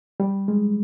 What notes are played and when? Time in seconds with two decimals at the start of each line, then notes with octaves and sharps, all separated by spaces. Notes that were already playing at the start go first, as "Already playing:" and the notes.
0.20 G3
0.48 G#3